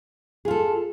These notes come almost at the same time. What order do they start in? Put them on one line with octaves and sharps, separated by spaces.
G#4 F4 A4